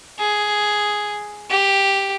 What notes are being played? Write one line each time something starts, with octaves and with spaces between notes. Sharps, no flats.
G#4
G4